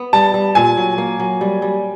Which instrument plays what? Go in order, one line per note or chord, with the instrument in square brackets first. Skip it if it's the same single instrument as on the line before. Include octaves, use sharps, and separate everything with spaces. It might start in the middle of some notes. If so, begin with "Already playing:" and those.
Already playing: [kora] B3
[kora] G3 [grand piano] A5
[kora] G3
[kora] A#2 [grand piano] G#5
[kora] F#3
A#3
F#3
G3
G3